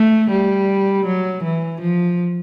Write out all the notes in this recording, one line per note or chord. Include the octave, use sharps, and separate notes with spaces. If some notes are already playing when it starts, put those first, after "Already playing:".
Already playing: A3
G3
F#3
E3
F3